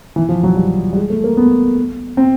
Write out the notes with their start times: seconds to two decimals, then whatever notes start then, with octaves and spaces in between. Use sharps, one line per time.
0.16 E3
0.29 F3
0.43 F#3
0.56 G3
0.93 G3
0.97 G#3
1.10 A3
1.24 A#3
1.37 B3
2.17 C4